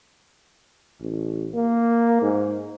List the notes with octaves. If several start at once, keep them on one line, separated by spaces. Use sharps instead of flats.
A1
A#3
G#2